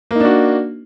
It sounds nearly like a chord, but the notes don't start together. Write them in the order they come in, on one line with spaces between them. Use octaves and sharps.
A#3 D#4 D4 F#4